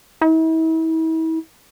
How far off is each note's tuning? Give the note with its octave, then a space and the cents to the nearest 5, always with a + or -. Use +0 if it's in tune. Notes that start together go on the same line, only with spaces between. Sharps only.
E4 -40